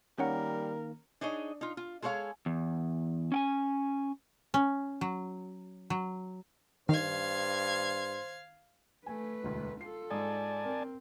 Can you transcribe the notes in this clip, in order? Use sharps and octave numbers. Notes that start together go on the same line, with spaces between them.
D#3 G3 A#3 C#4 A#4 C#5 F#5
D4 D#4 G#4 C#5 D#5
D#4 F4
F4
G#3 G#4 A4 C#5 F5
E2
C#4 G5 G#5
C#4
F#3
F#3
G2 D#3 C5 F5 G#6
A3 B4 G#5
E1 D2
F4 A4 C7
G#2 D5 G#5 A5 D#6
C4 A#4